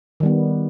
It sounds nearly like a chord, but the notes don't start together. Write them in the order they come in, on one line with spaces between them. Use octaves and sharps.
D#3 G3 B3